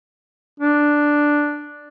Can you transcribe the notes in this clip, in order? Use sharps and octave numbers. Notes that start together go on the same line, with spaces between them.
D4